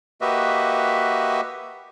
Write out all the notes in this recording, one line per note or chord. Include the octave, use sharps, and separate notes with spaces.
A#3 F#4 G4 B4 D#5 E5